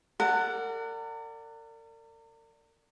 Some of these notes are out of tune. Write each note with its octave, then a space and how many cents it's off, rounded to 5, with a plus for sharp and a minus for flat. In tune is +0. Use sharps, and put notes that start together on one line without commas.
A#4 -40 D5 +0 F#5 +0